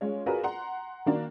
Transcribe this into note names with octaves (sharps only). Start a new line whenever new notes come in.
G#3 C#4 F4 C#5
F4 F#4 G#4 A#4 B4 D5
F#5 A#5 C6
D#3 A#3 D4 F#4